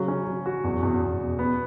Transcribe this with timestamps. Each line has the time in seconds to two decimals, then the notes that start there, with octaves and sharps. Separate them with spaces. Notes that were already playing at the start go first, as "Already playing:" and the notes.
Already playing: C#3 F#3
0.08 C#4
0.27 F#3
0.46 F#4
0.64 E2
0.83 E2
1.02 E2
1.20 B2
1.39 B3